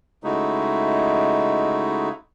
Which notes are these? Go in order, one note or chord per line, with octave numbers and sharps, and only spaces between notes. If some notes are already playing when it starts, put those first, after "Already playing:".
C#3 G#3 A3 D#4 E4 F#4